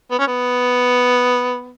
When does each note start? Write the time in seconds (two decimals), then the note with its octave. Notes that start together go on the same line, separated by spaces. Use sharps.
0.11 B3
0.19 C#4
0.27 B3